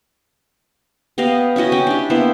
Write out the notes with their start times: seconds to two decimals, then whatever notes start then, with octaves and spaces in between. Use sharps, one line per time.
1.18 B3 G4 D#5 F5
1.56 C#4 E4 F#4 D#5
1.72 C#4 G5
1.87 D4 G4
2.10 A#3 B3 E4 C5